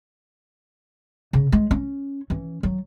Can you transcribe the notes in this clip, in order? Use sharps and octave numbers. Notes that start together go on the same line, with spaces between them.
C#3
G#3
C#4
E3 C#4
F#3